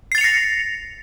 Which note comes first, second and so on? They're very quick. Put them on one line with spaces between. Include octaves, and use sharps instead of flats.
C7 A6 F7 C#7 A#6